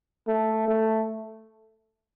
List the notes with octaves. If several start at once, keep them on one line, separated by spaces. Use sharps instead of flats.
A3
A3